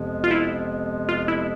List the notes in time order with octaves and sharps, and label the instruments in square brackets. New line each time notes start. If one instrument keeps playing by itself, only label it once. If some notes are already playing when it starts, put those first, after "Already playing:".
Already playing: [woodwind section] F2 C3 F3 G#3 B3
[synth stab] F4
E4
F4
E4